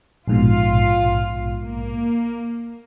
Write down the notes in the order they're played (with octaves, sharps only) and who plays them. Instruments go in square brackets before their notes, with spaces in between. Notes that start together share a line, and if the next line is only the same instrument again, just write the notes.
[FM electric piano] A#1 G#2 B2 [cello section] F4 F5
[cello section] A#3